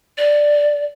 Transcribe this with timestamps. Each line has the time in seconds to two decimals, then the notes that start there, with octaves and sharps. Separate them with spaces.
0.17 D5